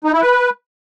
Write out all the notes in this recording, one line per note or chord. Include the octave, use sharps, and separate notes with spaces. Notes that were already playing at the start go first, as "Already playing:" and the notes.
D#4
E4
B4